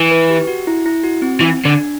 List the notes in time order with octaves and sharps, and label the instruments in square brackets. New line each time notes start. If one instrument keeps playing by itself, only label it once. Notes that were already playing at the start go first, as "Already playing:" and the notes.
Already playing: [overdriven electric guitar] E3
[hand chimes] B4
G4
F#4
E4
E4
F#4
C4
[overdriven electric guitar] E3
[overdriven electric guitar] D3 [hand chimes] D4